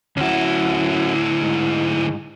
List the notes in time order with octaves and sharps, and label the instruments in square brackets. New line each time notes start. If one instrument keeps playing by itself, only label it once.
[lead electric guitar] D2 E4 [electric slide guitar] C#4 F#4
[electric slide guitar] G#2